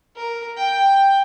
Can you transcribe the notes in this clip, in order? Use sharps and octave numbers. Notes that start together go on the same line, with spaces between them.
A#4
G5